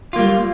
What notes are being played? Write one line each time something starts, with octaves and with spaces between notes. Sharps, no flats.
G3 A#3 F4